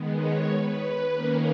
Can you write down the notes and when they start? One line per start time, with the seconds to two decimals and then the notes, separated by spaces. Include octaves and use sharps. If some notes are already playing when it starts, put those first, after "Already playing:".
Already playing: D#3 G#3 B3
0.17 C#5
0.50 B4
1.13 D#3 A#3 C#4 A#4